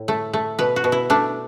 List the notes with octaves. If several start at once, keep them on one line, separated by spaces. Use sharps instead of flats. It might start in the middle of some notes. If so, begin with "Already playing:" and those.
Already playing: A2
A3
A3
B2 B4
F#4
B2
E4
A3 D4